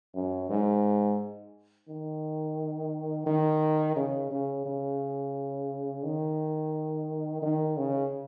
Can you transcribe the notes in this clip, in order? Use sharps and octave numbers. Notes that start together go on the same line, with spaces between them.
F#2
G#2
D#3
D#3
C#3
C#3
C#3
D#3
D#3
C#3